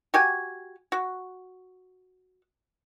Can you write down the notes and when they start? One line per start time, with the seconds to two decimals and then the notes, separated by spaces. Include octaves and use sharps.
0.14 F#4 G4 G#5
0.92 F#4